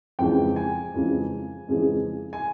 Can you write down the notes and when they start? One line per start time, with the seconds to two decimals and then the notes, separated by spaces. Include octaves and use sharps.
0.19 F2 C#3 E3 G#3 G5
0.56 G#5
0.94 F2 C#3 E3 G#3
1.68 F2 C#3 E3 G#3
2.33 G#5